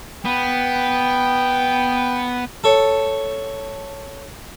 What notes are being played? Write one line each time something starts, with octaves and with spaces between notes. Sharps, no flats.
B3 G5
A4 C#5